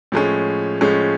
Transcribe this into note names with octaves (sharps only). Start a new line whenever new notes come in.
A2 F3 G#3 C#4
A2 F3 G#3 C#4